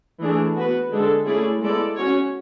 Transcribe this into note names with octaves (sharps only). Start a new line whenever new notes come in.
E3 A3 D4 G#4
B3 F#4 B4
D3 G#3 D4 A4
A3 C#4 E4 G#4 D5
G#3 B3 E4 A4 D5
C#4 F#4 C#5